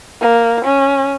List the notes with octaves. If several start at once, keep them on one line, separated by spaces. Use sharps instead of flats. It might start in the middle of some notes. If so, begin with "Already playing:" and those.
A#3
C#4